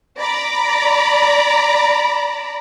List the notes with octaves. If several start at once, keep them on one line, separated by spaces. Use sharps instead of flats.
D5 A#5 B5